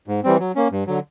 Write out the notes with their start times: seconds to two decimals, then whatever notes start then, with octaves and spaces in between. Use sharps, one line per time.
0.08 G#2
0.24 E3 G3 C4
0.39 F#3
0.56 A#3 C#4
0.71 G2
0.87 D3 F#3